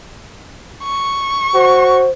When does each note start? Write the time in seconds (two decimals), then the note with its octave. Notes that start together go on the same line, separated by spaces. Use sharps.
0.84 C#6
1.54 F#4 C5